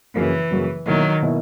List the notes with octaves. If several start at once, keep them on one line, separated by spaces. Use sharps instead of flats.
F#2 C#3 E3 F#3 A#3
F#2 C#3 F#3 A#3
B2 D#3 F#3 A#3 E4
B2 A#3 E4